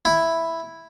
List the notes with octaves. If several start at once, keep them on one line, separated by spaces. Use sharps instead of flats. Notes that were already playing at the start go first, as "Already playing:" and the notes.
E4